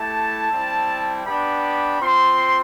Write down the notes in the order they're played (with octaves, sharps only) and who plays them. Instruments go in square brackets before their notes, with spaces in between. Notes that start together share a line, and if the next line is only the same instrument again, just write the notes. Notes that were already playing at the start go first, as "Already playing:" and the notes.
Already playing: [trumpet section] A3 E4 G4 A5
G3 C4 E4
B3 D4 G4 B5
C4 F4 C6